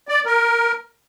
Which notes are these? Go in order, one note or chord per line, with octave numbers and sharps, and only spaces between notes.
D5
A#4